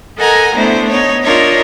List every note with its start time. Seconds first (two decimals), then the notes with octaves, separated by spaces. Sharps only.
0.18 A4 A#4 D#5 F#5 G#5 A#5
0.55 A3 B3 D4 E4 C5
0.90 B3 D#4 C#5
1.24 D4 D#4 F4 A#4 C#5